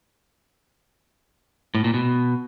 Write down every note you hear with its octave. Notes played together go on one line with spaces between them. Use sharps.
A2
A#2
B2